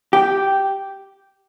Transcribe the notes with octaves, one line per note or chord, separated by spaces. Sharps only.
G4